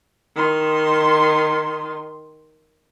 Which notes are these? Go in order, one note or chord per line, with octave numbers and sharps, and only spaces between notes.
D#3 C6